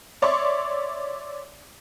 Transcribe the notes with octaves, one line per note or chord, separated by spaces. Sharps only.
C#5 D5 E5 C6 C#6